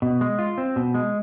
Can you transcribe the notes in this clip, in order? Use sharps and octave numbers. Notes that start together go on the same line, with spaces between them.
B2
G#3
F4
C4
B2
G#3